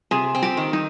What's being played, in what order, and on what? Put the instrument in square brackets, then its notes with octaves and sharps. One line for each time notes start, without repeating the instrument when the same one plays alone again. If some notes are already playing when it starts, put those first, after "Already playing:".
[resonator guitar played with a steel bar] C3 [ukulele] G#4
[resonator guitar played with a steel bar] C4
[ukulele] G4
[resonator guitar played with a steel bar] D#3
[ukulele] D#4